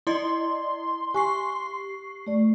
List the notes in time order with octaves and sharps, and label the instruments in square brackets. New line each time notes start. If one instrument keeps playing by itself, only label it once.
[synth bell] E4 D5 D#5 [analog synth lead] C6
[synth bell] G4 C#6 C7 [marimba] G#5
[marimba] A3 D5